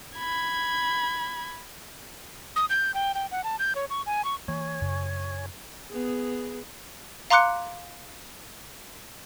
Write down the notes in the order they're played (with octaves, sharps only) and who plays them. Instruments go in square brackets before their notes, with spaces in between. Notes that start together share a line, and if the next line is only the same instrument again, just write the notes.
[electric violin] B5 G#6
[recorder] D#6
G6
G5
G5
F#5
A5
G6
C#5
C#6
G#5
C#6
[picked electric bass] E3 A#3 [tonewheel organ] C#5 G#5
[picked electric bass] F#2 C#3
[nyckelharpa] B3 G#4
[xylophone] F5 A#5 C6 D6 F#6 C#7